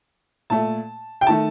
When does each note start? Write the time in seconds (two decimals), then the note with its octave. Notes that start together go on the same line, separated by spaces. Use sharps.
0.50 A#2 A3 A5
1.21 G5
1.27 D#3 A3 A5